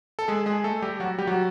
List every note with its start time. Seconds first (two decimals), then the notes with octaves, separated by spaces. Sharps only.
0.19 A4
0.28 G#3 G#4
0.46 G#3 G#4
0.64 A3 A4
0.82 G3 G4
1.00 F#3 F#4
1.18 G3 G4
1.27 F#3 F#4